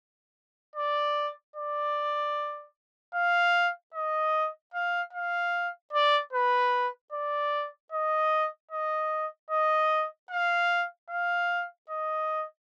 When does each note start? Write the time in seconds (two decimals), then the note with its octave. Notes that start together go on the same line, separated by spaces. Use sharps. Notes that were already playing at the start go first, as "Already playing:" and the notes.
0.76 D5
1.56 D5
3.14 F5
3.94 D#5
4.74 F5
5.13 F5
5.93 D5
6.33 B4
7.12 D5
7.92 D#5
8.71 D#5
9.50 D#5
10.30 F5
11.10 F5
11.89 D#5